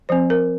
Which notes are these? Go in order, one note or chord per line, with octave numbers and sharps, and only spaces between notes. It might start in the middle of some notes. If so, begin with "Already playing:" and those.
F3 C4 C5
A#4